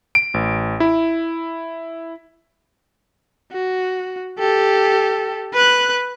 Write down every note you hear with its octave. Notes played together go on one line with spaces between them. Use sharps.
D7
A1
E4
F#4
G4 A4
B4 F#6